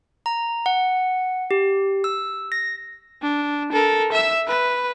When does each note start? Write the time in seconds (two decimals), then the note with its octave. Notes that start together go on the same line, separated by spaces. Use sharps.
0.26 A#5
0.66 F#5
1.51 G4
2.04 E6
2.52 A#6
3.22 D4
3.73 A4 A#4
4.12 E5 E6
4.48 B4